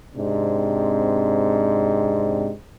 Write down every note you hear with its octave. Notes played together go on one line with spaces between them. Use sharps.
G#2 C3 C4 D4